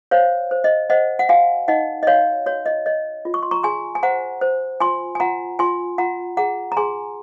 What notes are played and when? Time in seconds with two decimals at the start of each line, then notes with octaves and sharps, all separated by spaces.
0.11 C5 C#5 F5
0.51 C5
0.64 D#5
0.90 C5 D#5 F#5
1.19 F#5
1.29 F#4 F5 G#5
1.68 D#4 D#5 F#5
2.03 D#5
2.07 F#4 C#5 F5
2.46 F#4 C#5
2.66 D#5
2.86 C#5 D#5
3.25 F4
3.34 C#6
3.43 C6
3.51 A#5 C#6
3.63 G#4 G#5 C6
3.95 G#5
4.03 C5 F#5 A#5
4.41 C5
4.80 F4 G#5 C6
5.15 G#5
5.20 F4 F#5 A#5
5.59 F4 G#5 C6
5.98 F4 F#5 A#5
6.37 G#4 F#5 A#5
6.72 A#5
6.77 G#4 G#5 C6